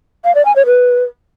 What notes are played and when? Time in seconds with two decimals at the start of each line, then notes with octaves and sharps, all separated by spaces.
0.25 F5
0.35 D5
0.45 G#5
0.56 C#5
0.66 B4